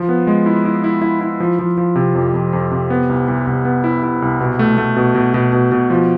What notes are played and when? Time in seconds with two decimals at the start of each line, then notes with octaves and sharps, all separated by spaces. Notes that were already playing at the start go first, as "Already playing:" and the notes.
Already playing: F3
0.09 B3
0.27 G#3
0.46 E4
0.65 E4
0.84 E4
1.02 E4
1.21 E4
1.40 F3
1.59 F3
1.78 F3
1.95 C3
2.15 F2
2.34 F2
2.53 F2
2.71 C3
2.90 B3
3.09 C2
3.28 C2
3.47 C2
3.65 B3
3.84 E4
4.03 E4
4.22 C2
4.41 B2
4.59 A3
4.78 A3
4.96 B2
5.15 B2
5.34 B2
5.53 B2
5.72 B2
5.90 F3